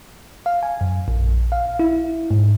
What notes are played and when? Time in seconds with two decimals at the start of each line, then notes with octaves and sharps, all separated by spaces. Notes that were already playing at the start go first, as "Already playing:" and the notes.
0.46 F5
0.63 G#5
0.81 F#2
1.08 A#1
1.52 F5
1.79 E4
2.31 G#2